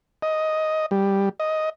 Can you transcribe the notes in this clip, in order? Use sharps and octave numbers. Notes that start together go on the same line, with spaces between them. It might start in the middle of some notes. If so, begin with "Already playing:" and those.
D#5
G3
D#5